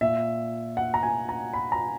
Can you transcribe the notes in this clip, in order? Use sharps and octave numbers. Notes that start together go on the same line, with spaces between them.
A#2 E5
F#5
A#5
G#5
A#5
B5
A#5